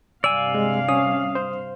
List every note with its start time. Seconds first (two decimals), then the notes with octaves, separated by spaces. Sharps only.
0.24 G2 C3 D5 F5 G#5 E6
0.55 G#3
0.89 C#4 D#6
1.35 C5